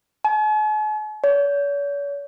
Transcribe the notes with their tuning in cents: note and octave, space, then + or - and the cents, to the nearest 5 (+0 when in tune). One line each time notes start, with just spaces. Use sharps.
G#5 +45
C#5 +45